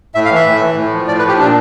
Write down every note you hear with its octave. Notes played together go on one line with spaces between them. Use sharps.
A2 E5
F5
E3 E5
A2
E3
A2
F3
A2 D5
B4
F3
G4
A#2 D4